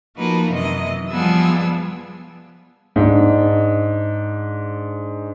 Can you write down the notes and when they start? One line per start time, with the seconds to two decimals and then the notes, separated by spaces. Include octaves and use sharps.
0.16 F3 A#3 D#4 F#4 A#4 B4
0.52 F#2 C3 E3 D#5
1.11 F3 G3 B3 G#4 E6
2.96 G#2 D4